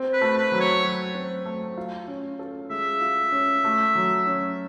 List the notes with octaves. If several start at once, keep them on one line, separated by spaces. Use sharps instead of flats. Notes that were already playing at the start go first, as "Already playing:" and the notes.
Already playing: C4
B4
A3
B4
F#3
C#5
F#3
C4
A3
F4
C#4
A4
G#3 E5
F4
C#4
A3
F#3
C#4